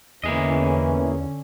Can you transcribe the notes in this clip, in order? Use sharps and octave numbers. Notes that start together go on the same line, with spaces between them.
E2 D3 E3 A#3 C#4 G#4 D#5